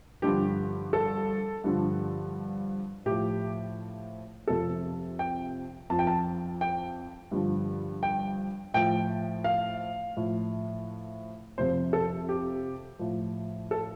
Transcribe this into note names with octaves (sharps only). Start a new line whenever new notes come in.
G2 D3 F3 G4
A4
G2 D3 F3
A2 F3 G4
F2 C3 F3 A4
G5
F2 F3 A5
G5
A5
G5
G2 D3 F3
G5
A2 F3 G5
F5
A2 F3
F2 C3 F3 C5
A4
G4
A2 F3
A4